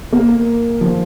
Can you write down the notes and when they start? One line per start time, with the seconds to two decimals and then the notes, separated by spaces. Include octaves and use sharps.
0.12 A#3
0.81 F3